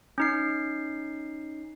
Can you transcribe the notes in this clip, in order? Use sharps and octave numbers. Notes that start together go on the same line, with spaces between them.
C#4 D#4 C7